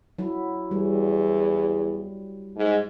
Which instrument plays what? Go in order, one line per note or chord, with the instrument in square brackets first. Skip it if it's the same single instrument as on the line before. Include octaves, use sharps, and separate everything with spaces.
[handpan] F#3 E4
[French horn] E2 [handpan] G3
[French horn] G#2